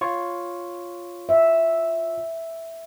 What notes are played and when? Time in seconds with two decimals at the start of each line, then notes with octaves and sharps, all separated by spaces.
0.01 F4 C#5 C#6
1.29 E5